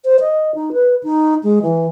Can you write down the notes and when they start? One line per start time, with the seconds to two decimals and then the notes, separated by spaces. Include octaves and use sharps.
0.05 C5
0.20 D#5
0.55 D#4
0.73 B4
1.03 D#4
1.43 G#3
1.62 E3